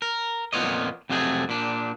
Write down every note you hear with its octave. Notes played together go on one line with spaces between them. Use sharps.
A#4
F2 A#2 B3 F4 C#5 D#5
F2 C3 F#3 A3 G#4
A#2 D4